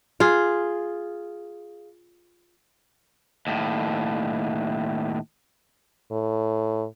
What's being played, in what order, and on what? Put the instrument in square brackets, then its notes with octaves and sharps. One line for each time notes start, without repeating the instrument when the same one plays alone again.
[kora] F4 G#4
[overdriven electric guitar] D#2 A2
[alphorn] A2